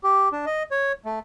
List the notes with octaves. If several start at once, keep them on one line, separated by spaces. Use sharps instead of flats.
G4
D4
D#5
C#5
A3